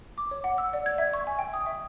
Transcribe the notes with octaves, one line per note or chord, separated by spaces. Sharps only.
D6
C#5
F#5
E6
D5
G#6
E5
C#6
G#5
G5
D#6
E5